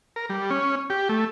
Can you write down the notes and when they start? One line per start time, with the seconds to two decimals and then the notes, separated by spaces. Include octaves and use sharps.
0.16 A#4
0.30 G3
0.50 C#4
0.90 G4
1.09 A3